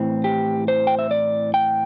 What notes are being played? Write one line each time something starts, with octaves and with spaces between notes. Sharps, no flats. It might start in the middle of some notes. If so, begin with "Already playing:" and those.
Already playing: A2 E3 C4
G4
C5
G5
E5
D5
G5